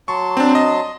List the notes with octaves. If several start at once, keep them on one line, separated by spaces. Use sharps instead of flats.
F#3 A5 C6 C#6
C4 D4
D#5